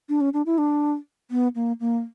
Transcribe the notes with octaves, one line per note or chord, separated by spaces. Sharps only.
D4
C#4
D4
E4
D4
B3
A#3
A#3